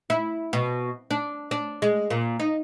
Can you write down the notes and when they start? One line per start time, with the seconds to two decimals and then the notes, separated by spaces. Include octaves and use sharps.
0.10 E4
0.53 B2
1.11 D4
1.51 D4
1.82 G#3
2.10 A#2
2.40 D#4